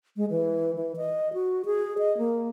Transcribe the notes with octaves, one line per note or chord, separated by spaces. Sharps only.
G#3
E3
E3
D#5
F#4
G#4
D#5
A#3